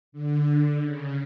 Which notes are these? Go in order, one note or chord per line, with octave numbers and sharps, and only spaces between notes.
D3
C#3